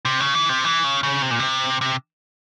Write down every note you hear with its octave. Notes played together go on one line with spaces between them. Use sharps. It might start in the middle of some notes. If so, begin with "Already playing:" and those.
C3
C#3
E3
C3
E3
C#3
C#3
C3
A#2
C3
C3